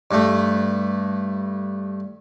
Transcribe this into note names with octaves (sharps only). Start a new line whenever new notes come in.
G2 A3